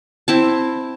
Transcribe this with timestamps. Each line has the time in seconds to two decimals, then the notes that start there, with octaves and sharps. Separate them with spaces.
0.28 C4 E4 A5